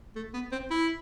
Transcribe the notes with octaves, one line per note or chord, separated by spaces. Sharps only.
A3
B3
C4
E4